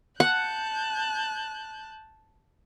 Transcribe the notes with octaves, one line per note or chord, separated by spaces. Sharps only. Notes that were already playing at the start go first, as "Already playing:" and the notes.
F#5 A5 F#6 G6